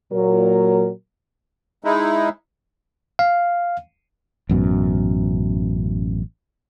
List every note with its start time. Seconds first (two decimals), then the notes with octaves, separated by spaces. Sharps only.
0.12 A#2 F#3 A#4
1.84 G#3 D#4 E4
3.19 F5
4.49 A1 F#2 B2